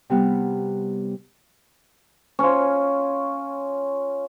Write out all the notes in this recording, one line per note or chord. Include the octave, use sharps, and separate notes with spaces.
C3 G3 B3
C#4 F4